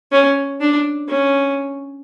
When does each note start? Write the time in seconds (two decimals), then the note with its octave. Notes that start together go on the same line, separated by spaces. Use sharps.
0.12 C#4
0.61 D4
1.08 C#4